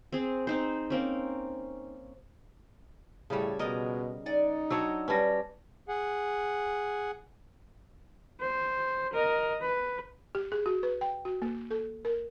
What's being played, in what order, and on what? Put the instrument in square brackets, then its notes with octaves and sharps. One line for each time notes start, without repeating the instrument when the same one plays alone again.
[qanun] C4 G#4
C4 D#4 C5
A#3 C4 C#4
[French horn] A2 [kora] C#3 G3 [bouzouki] A4 C#5
[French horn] B2 [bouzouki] F3 G#3 [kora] A#4 D#5
[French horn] D#4 [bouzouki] D5 F#5 G#5
[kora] F#3 D4 C#5 [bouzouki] D#5 F5 G5 [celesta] E6
[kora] G3 C#4 [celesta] B4 A5 A#6 [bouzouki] D5
[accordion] G#4 F#5
[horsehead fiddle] C5
A#4 D#5
B4
[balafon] G4
G#4
F#4
B4
G5
F#4
A#3
A4
A#4